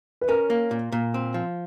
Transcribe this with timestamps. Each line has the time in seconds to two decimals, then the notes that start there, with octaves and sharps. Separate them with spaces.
0.21 B4
0.29 C#4 A#4
0.50 A#3
0.71 A#2
0.92 A#2
1.14 C4
1.34 F3